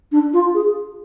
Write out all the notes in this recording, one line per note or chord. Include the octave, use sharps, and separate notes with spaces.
D4
F4
G#4